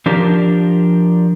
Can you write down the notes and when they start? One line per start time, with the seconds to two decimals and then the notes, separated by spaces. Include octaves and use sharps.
0.06 F3 D4 G4 A#4